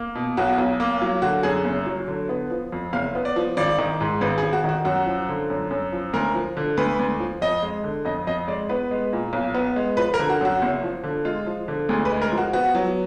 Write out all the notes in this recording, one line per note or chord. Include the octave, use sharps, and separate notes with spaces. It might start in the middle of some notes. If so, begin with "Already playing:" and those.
Already playing: A#3
B2
B1 F#4
B1
A#3
F#3
D3 F#4
F#2 G#4
F#1
F#3
D3
B3
F3
F2
F#1 F5
B3
D5
F3
G#1 D5
D#3
G#2
G#1 B4
G#4
G#1
F#4
D#3 F#4
F#2 F#4
F3
D3
F#2
F#2
F3
D2 A#4
F3
D3
D2 B4
D2
F3
F2 D#5
G#3
D3
F2 D#5
F2 D#5
G#3 D5
B3 B4
G#3
A#2
B1
B3
G#3
F3 B4
A#4
D3
F#4
F#2 F#4
F#1
F3
D3
G#3 F4
F3
D3
D2 G#4
B4
G#3
A#4
F3
F#4
B3 F#4
F#3